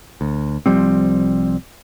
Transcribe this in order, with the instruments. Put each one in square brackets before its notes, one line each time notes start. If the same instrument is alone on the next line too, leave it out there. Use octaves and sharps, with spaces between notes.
[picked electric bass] D2
C2 F3 G3 C4